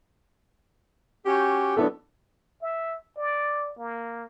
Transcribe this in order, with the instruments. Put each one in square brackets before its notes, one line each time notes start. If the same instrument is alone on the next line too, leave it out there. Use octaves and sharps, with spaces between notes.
[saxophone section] C#4 F#4 G4
[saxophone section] F#3 A3 B3 [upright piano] D4 E4 A4
[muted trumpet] E5
D5
A#3